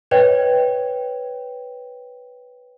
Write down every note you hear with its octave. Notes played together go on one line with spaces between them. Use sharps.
B4 C#5 D#5 G5